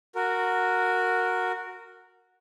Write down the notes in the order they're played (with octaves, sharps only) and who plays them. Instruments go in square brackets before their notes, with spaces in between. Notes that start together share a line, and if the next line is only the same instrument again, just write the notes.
[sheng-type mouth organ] F#4 A#4